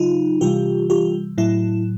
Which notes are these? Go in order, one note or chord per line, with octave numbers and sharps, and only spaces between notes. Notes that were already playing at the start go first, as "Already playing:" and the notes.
Already playing: C#3 F#3 D#4 F4
C3 E3 G3 F4 G4
F4 G4
A2 F#3 E4